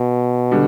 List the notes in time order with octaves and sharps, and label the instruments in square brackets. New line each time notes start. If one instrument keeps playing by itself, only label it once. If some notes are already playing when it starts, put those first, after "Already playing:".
Already playing: [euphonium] B2
[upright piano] D3 G3